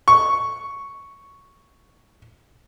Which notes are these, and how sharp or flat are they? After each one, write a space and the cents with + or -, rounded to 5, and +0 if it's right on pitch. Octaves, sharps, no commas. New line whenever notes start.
C#6 +0